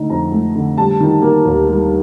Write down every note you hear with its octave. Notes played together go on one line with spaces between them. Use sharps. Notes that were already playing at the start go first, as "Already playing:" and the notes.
Already playing: D3 A3 D#4
F2 A#5
A3
D3
G3 A5
D#3
A#3
D#2
G3